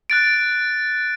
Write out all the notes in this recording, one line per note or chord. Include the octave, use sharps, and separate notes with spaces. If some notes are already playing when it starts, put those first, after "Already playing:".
F#6 A6 D7